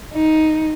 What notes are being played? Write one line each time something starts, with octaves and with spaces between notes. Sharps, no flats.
D#4